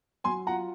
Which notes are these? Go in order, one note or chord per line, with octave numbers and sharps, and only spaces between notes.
F#3 G#5 C6
F4 F#5 A#5